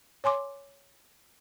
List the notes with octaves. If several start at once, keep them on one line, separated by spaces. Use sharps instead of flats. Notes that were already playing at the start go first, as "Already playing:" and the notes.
C#5 G#5 C6 D6